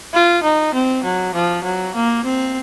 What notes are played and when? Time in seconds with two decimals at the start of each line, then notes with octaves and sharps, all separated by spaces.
0.14 F4
0.43 D#4
0.74 C4
1.04 F#3
1.35 F3
1.64 F#3
1.95 A#3
2.24 C4